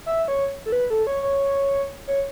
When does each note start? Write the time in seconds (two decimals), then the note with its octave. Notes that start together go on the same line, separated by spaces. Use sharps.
0.06 E5
0.28 C#5
0.66 A4
0.72 B4
0.90 A4
1.07 C#5
1.23 C#5
2.08 C#5